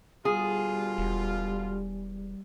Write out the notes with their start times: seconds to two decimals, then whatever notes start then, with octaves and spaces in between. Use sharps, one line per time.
0.25 B2 D3 G3 F4 G#4
0.98 E1